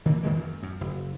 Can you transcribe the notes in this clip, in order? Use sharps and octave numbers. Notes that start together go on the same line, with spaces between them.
D#3 E3 G3 A#3
E2 D#3 G#3 A#3
F#2
F#2
F#1